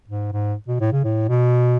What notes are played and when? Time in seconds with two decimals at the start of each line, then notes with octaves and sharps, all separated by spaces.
0.08 G#2
0.32 G#2
0.68 B2
0.81 A2
0.93 C#3
1.04 A2
1.29 B2